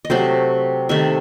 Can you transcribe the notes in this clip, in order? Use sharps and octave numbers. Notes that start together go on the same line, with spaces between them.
D#5
C3 F#3 A3 C4 C5
C3 D#3 A3 E5